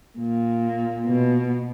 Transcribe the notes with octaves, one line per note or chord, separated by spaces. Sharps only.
A#2
B2